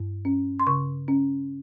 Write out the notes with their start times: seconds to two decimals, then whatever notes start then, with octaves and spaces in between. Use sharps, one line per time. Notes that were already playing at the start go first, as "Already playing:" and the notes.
Already playing: G2
0.25 C#4
0.60 C6
0.67 C#3 C#6
1.08 C#4